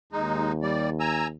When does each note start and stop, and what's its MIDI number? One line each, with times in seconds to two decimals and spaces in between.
0.12 1.36 39
0.12 0.52 56
0.12 0.52 63
0.62 0.90 55
0.62 0.90 74
1.00 1.27 80
1.00 1.27 82
1.00 1.27 88